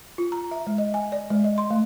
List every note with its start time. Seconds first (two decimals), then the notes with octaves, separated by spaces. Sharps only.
0.18 F4
0.32 A#5
0.51 E5
0.67 G#3
0.78 D#5
0.94 G#5
1.12 D5
1.30 G#3
1.44 D#5
1.58 C6
1.71 A3